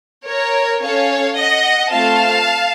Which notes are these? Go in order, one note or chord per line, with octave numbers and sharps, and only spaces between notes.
A#4 C#5
C#4 A4 C#5 F5
D#5 F#5
A3 C4 F4 A4 F5 A5